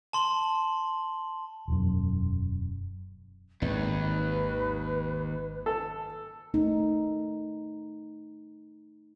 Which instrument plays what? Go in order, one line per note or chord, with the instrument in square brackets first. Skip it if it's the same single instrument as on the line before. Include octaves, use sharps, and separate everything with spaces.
[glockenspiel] A5 C6 F#7 G7
[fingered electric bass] E1 F#2
[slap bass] G#1 [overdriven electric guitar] D#2 [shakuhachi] B4
[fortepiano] A4
[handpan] A3 D#4